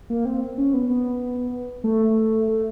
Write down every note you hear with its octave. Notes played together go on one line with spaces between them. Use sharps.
A#3
C4
C#4
B3
B3
A3
A3